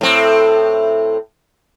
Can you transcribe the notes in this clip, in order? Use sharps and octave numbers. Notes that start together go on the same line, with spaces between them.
A2 C4